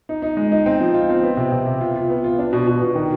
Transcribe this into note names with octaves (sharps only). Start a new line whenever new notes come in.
D#4
D#4
G#3
D#4
C4
F3
F4
C4
B3
C3
C3
C3
F4
F4
B3
F4
D4
B2
B2
B2
D#3